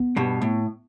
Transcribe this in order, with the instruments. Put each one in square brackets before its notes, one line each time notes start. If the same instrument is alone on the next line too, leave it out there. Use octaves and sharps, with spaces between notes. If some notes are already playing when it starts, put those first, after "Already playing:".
Already playing: [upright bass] B3
[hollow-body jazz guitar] G2 B2
A2